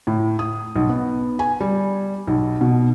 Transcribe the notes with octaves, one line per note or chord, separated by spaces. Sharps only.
A2
D#6
B1
B3
G#5
G3
B1
B2